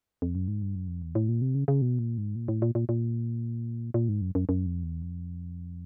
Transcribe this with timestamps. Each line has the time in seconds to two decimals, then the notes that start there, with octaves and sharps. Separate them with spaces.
0.22 F2
0.35 F#2
0.48 G#2
0.62 G2
0.75 F#2
0.88 F2
1.02 E2
1.15 A2
1.28 A#2
1.41 C3
1.55 C#3
1.68 C#3
1.82 B2
1.99 A#2
2.18 G#2
2.36 A#2
2.48 A2
2.62 A#2
2.75 A#2
2.89 A#2
3.94 A#2
4.09 G#2
4.21 F#2
4.35 F#2
4.49 F#2
4.66 F2
4.83 E2
5.02 F2